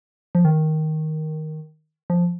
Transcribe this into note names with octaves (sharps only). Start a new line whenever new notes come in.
F3
D#3
F3